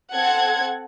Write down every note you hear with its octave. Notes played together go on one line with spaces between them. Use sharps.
C4 A4 F#5 G#6